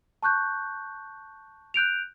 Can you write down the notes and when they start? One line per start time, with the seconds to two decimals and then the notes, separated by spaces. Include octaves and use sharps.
0.23 A5 C#6 F#6 G6
1.74 F#6 G6 D7 F7